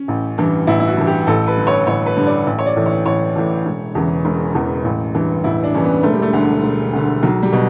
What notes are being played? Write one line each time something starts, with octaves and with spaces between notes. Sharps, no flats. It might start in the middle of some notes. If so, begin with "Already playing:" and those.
Already playing: C#4
A1
G2 E3
A1 E4
E4
F#4
G2 E3
G4
A1 A4
B4
G2 D3
C#5
A1 C#5
B4
G2 D3
D5
A1
C#5
D5
A2 E3
C#5
A1 C#5
A2 E3
E1
E2 C#3 E3
E1
E2 C#3 E3
A1
G2 E3
A1 E4
D4
G2 E3 C#4
B3
E1 A3
G3
A3
D2 D3
E1
D2 D3
B1 F#3
G3
B2